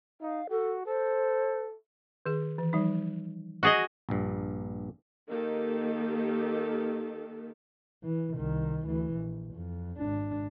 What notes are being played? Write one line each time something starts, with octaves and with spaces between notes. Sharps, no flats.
D#4 F5
F#4 A4
A4 C5
D#3 G#4
E3
F3 G3 D#4
F#4 G#4 D#5
A#1 G2
D#3 A#3 D#4 G4 A4
E3
C2 D#3
D2 E3
A#1
F2
G#1 D4